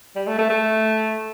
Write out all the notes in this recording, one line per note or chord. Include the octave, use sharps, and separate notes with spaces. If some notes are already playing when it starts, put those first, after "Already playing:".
G3
A3
A3
A3